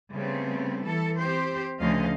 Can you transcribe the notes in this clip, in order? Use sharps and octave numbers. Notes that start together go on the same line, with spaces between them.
C#3 G3 A3 B3 C4
E3 A4
C4 G4 C5
D2 C#3 F3 C#4 D#5 F5